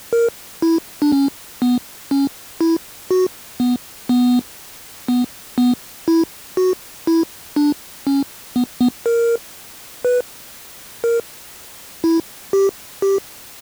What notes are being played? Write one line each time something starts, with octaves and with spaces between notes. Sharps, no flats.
A#4
E4
D4
C#4
B3
C#4
E4
F#4
B3
B3
B3
B3
E4
F#4
E4
D4
C#4
B3
B3
A#4
B4
A#4
E4
G4
G4